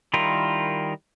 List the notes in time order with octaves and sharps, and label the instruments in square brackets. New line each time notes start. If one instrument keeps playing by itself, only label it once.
[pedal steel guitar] D#3 G3 E4 F4 A#4